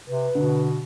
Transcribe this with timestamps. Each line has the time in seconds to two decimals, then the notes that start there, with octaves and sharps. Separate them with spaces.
0.08 C3 B4
0.35 B2 D3